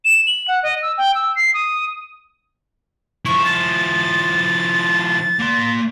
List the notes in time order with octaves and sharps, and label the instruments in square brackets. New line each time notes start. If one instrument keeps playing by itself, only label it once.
[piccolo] E7
F#7
F#5
D#5
E6
G5
E6
C7
D#6
[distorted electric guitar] F3 E4 [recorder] C#6
[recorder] A6
[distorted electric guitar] A#3 C6